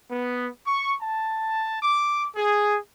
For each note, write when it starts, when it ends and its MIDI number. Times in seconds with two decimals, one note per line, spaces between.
0.10 0.48 59
0.67 0.94 85
1.01 1.77 81
1.82 2.27 86
2.36 2.77 68